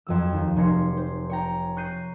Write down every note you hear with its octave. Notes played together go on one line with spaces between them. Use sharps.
F2 F#3 E6
D#2
F1 C#5 C6 G#6 A#6 C#7
C5
C#5 G5 A#5
C#6 F#6 G6 A#6 C7 D#7